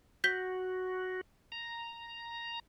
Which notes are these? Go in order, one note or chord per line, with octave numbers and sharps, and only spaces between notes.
F#4 G6 B6 G7
A#5